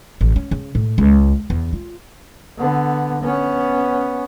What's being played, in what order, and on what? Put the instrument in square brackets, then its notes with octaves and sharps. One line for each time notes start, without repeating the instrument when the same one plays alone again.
[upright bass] A1
C#4
C#3
A2
C#2
E2
F4
[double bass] D3 B3
B3 C#4